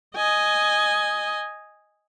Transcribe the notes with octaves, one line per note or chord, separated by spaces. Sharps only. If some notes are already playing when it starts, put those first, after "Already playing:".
D#5 G#5